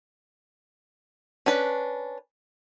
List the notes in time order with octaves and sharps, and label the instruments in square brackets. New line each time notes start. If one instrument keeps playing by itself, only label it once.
[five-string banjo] C#4 D4 B4